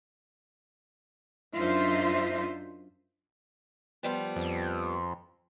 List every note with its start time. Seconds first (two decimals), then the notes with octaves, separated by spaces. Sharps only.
1.56 F#2 D4 D#4 F4 C5 E5
4.03 F3 G3 B3
4.36 F2